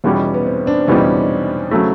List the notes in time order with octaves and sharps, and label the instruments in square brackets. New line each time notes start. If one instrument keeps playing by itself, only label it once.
[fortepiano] E2 B2 G3 [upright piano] C#4 D#4
[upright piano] B3
C4
C4 D4
[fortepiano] E2 B2 G3 [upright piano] C#4 D#4
[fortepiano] C#3 F#3 A3